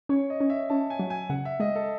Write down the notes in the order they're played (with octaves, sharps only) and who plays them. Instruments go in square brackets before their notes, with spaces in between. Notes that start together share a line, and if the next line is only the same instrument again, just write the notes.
[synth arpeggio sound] C#4 [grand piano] C#5
[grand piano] D#5
[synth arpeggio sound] C#4
[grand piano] E5
[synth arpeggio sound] C#4 [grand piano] A5
[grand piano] G#5
[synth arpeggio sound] F#3
[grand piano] G#5
[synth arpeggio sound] C#3 [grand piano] F#5
[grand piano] E5
[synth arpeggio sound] G#3 [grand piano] D#5
[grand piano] A4